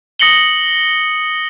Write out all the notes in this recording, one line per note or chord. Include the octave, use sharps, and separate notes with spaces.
D#6 A#6 C#7 F#7 G7